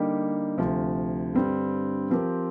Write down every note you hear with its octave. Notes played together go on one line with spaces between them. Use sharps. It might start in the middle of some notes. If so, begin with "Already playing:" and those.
Already playing: D3 G3 A#3 D#4 G4
D2 C3 F3
G2 D3 G3 C4
F3 C4 G4 A#4